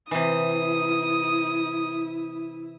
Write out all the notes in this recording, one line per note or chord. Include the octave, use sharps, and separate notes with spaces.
C3 E3 E4 D#6